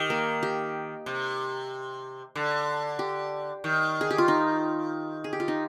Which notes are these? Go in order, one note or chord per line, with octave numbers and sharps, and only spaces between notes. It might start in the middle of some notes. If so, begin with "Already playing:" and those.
Already playing: D#3 G4
A#3
G4
C3
D3
G4
D#3
G#4
G4
F4
D#4
G#4
G4
F4
D#4